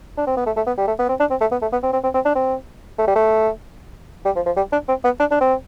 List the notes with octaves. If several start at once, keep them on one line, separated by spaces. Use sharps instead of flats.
D4
C4
B3
A3
A3
B3
G3
A3
B3
C4
D4
C4
A3
B3
A3
B3
C4
C4
C4
C4
D4
C4
A3
G3
A3
G3
F3
F3
G3
D4
C4
B3
D4
D4
C4